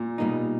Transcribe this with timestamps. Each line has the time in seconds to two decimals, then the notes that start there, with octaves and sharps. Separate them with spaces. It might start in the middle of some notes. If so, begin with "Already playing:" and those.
Already playing: A#2
0.18 B2 G3 A#3 D#4